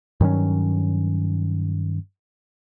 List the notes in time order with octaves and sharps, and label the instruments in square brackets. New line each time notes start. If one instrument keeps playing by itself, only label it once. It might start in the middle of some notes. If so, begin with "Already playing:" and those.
[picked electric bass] G2 D#3 F#3 C#4